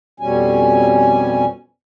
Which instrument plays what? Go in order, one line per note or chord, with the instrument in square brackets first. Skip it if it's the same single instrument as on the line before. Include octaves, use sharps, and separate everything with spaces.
[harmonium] F2 B2 G3 C#4 G#5